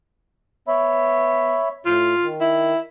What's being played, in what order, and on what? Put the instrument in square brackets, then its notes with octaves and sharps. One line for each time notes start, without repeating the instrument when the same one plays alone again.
[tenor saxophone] B3 [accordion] C#5 E5 B5
[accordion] A2 [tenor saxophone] F4
[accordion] D#3
[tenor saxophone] E4